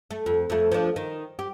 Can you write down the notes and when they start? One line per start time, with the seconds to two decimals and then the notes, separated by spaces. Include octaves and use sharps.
0.11 A3
0.26 F2
0.50 F2 A3
0.72 F3 D4
0.96 D#3
1.39 G4